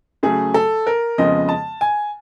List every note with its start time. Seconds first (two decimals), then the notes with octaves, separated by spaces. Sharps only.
0.23 C#3 F#3 A3 G#4
0.54 A4
0.87 A#4
1.18 F2 C#3 F3 G#3 B3 D#5
1.49 A5
1.81 G#5